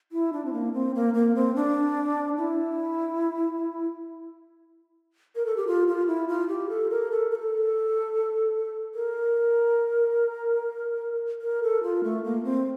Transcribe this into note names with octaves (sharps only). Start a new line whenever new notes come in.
E4
D4
C4
A#3
C4
A#3
A#3
C4
D4
E4
A#4
A4
G4
F4
F4
E4
F4
G4
A4
A#4
A4
A#4
A4
A#4
A#4
A4
F4
A3
A#3
C4